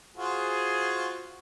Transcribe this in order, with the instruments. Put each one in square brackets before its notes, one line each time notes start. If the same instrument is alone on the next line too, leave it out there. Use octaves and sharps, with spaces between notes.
[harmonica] F4 F#4 C5 [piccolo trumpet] G#4